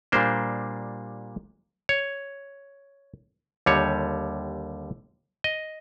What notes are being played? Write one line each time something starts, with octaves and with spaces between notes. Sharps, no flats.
A#2 G3 A#3 D4 C5
C#5
D#2 D3 G3 C#5
D#5